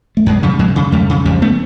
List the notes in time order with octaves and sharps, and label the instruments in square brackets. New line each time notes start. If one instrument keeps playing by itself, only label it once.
[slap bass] A3
F#2 G#3
C#3 F3 G3
F#2 F#3 G#3
C#3
F2 G3 A3
C#3
F2 F3 G3
A3 B3